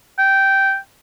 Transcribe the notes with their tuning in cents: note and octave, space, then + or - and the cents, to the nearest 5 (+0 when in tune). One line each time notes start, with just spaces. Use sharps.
G5 -10